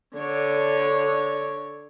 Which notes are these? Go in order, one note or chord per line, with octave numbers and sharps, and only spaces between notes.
D3 C#5 D5